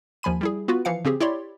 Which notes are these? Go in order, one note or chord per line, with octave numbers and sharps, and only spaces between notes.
D#2 F3 G#5 B5 D#7
G3 E4 G#4
B3 F4 F#4 B4
E3 F3 F5 C#7
C#3 C4 G4 G#4
E4 G4 C#5 D5 C6